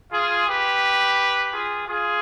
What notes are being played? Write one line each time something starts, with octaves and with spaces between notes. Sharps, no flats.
F4 G#4
G4 B4
F4 G#4
F4 G#4